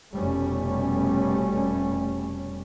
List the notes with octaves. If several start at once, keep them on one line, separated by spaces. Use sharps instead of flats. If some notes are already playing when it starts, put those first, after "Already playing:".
F1 B2 G3 A3 C#4